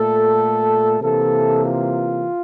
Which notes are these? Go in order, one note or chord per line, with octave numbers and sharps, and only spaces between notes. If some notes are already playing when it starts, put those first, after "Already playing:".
Already playing: A#2 A3 A4
C3 E3 A#3 A4
F4